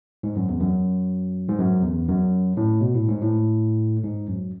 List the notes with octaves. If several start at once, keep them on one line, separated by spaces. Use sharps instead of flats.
G#2
F#2
E2
F#2
G#2
F#2
E2
F#2
A2
B2
A2
G#2
A2
G#2
F#2